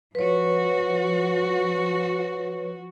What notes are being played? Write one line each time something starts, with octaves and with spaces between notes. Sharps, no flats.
F3 F#4 B4 C#5